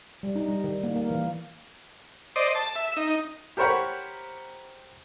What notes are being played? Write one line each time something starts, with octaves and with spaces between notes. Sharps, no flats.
G3
D#4
G3
D#3
A#3
A#3
E3
C5 D5 D#5
A5
E5
D#4
G4 A#4 C5 C#5 F#5 B5